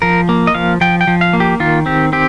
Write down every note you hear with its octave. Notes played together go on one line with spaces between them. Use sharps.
F3 A#4
A#3
D#5
F3 F5
F3 G5
G5
F3
F5
A#3
G4
D#3 F4
C4 G4
C4 G4